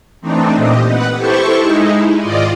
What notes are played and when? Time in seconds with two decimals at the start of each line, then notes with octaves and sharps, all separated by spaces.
0.21 E3 A3 C4 D4 D#4
0.55 A#2 C4 G4 D#5
0.84 B4 F#5
1.15 E4 G4 A4 C5 C#6
1.59 G#3 D#4 E4
2.19 G#2 D#3 F4 D5 D#5